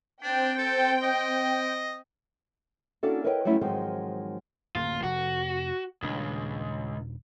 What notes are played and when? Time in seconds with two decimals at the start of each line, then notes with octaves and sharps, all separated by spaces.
0.22 C4 D4 G5
0.58 A4
1.03 D#5
3.03 A#3 C#4 D4 E4 F#4 A4
3.24 A#4 B4 C#5 D#5 F5 G5
3.45 F#3 G3 A3 C#4 E4
3.61 G#2 D#3 F3 F#3 G#3 C4
4.75 D1 F#2 A#3 F4
5.03 F1 F#4
6.02 D#1 C#2 D4